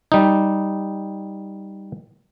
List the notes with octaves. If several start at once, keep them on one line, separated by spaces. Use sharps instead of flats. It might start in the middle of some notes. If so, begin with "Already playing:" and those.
G3 D#4